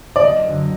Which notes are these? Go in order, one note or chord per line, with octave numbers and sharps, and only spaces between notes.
D5
F#1 D#5
F#2 D3